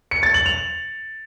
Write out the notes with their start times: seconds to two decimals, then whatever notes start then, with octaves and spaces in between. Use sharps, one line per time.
0.11 C#7
0.23 A6
0.34 F#7
0.46 F7